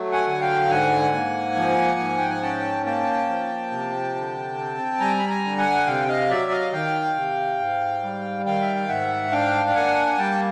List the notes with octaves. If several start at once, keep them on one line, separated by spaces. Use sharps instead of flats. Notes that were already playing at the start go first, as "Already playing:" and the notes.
Already playing: F#3 A3
F#5 G#5
D3 G#5
F5 G5
G#2 F#5 G#5
A#3
F3
G#2
G5
G#5
C#4 G5 A5
A#3 G5 A5
F3
C3
D3
C4
G3 G#5 A#5
B5
G#5 A#5
D3
F#5 G#5
C3 F5 G5
D#5 F5
F#3 D5 E5
D#5 F5
D#3 F5 G5
C3
G#2
G3
D#3 F5 G5
E5
F5
G#2 E5 F#5
D4 F5 G5
G5
A#3 F#5 G#5
G3 G5 A5